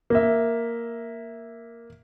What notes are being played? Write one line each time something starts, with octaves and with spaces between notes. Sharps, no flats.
A#3 E5